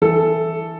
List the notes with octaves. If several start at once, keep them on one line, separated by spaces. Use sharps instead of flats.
E3 A4